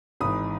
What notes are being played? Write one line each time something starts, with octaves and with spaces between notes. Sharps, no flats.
G#1 G#2 E3 B5 D#6